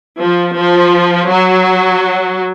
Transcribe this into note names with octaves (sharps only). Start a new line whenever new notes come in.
F3
F3
F#3